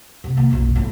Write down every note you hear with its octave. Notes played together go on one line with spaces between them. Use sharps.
C3
D#3 A#3
F#1 B1
G1 A2